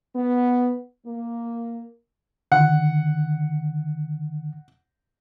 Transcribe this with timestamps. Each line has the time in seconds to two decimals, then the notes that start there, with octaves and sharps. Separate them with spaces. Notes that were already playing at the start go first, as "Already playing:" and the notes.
0.15 B3
1.06 A#3
2.52 D3 D#3 F#5